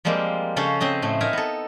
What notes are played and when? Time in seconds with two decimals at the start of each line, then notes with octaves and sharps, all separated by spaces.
0.05 F3 G3 G#3 A#3 C4
0.56 C#3 C#4 A4 C5
0.80 C#3 C4 C5 D#5
1.02 A2 A3
1.21 D#4 A#4 E5 F5 G#5 A#5
1.33 B3 A4